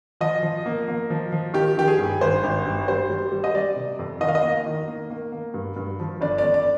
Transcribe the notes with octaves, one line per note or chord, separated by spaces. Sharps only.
F3 D#5
F3
A#3
A#3
F3
F3
D#3 G4
D#3 G4
G#4
G2
G#1 C5
G#1
G2
G3 C5
G3
G3
D#5
G3 D5
C3
F2
D#3 D#5
F5
D#5
A#3
D#3
A#3
A#3
A#3
G2
G2
F3
G1 D5
G1 D5
D5